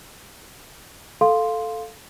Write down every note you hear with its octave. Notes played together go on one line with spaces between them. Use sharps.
A4 F5 C6